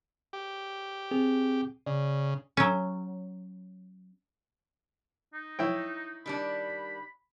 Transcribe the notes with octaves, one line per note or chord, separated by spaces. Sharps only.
G4
C4 G#4
C#3 D5
F#3 C#4
D#4
E4 C#5 G5
D#3 G3 D4 B5